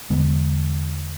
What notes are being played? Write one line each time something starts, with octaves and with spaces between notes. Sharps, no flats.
E2 D3 G#3 B3